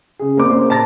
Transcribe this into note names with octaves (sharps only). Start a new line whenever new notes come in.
C#3 G#4
A#3 C4 D6
A#3 C#4 C5
A5 A#5 A6 A#6